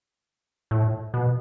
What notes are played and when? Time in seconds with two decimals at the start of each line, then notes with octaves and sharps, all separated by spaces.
0.71 A2
1.14 B2